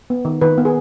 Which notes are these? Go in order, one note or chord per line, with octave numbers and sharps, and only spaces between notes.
B3
D#3
D#3 B4
B3
G#4